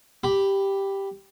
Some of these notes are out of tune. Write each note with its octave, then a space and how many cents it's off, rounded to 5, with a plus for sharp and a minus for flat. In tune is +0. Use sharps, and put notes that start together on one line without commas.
G4 +0 B5 +0